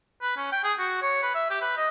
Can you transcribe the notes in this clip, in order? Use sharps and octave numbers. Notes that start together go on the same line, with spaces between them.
B4
C#4
G5
G#4
F#4
C#5
B4
E5
G4
B4
D#5